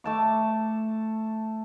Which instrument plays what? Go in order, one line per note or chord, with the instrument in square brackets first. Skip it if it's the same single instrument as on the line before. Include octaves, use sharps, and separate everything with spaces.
[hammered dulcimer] A3 A5 D6